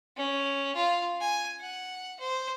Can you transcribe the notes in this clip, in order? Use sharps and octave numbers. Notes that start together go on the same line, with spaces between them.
C#4
F4
G#5
F#5
C5